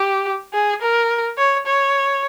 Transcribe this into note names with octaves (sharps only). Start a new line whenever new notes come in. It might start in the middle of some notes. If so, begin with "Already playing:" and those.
Already playing: G4
G#4
A#4
C#5
C#5